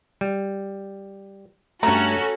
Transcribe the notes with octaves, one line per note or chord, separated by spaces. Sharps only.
G3
G2 A3 C#4 F#4 A4 A#5